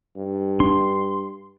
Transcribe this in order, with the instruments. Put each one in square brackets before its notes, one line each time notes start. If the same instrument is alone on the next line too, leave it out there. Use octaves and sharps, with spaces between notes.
[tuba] G2
[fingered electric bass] D4 [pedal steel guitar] C6